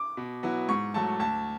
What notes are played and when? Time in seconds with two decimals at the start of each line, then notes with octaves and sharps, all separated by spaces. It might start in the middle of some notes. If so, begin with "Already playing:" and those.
Already playing: D6
0.17 B2
0.43 F#3 B3 E4
0.69 G#2 C#6
0.94 F#3 A3 A5
1.20 D2 A5